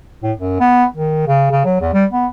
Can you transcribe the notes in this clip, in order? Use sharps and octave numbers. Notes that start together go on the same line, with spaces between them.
A2
F#2
B3
D#3
C#3
C#3
F#3
E2
G3
B3